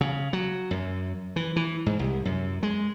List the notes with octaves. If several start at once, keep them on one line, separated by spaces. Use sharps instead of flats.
C#3
F#3
F#2
E3
E3
G#2
C2
F#2
G#3